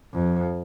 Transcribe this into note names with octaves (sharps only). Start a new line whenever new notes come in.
F2